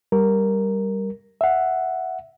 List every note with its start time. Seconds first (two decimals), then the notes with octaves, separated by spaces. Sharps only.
0.12 G3 A#4
1.41 E5 F#5